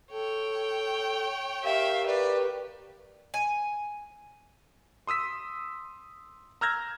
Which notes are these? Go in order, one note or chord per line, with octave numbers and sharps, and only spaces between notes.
A4 C#5 G5
G4 A#4 E5 F5
B4 D5
G#5
C6 D#6 E6 B6
A#5 E6 F6 G6 G#6 A#6